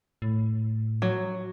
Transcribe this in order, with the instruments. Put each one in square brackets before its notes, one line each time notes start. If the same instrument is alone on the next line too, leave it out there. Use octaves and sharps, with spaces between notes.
[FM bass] A2
[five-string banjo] F#3